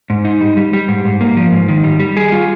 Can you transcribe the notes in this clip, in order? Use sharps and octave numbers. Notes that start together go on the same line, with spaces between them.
G#2
D#4
G3
G3
G3
G#2
G#2
A#3
F3
G#2
D#3
G3
G3
G#4
F4